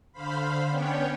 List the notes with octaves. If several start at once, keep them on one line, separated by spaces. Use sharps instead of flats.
D3 C5 F5 B5
B3 C#4 D4 C#5 G5